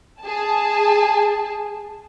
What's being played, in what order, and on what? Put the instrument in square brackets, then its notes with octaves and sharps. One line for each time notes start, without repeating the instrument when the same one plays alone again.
[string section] G#4 A5